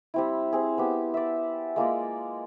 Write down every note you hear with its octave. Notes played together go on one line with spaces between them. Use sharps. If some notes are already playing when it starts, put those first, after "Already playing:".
G3 C4 E4
C4 G#4
B3 G4
D5 E5
G#3 A#3 F4 D5